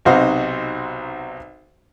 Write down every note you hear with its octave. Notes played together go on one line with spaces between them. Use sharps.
B1 C3 D#4 F#4 C5 F5